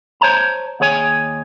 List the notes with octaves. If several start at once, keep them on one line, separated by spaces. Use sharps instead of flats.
C5 C#5 A5 A#5
D#2 G#4 C#5 G#5